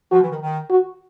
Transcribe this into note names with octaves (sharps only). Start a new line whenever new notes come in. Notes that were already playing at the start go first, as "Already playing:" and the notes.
F3 F#4
E3
D#3
D#3
F#4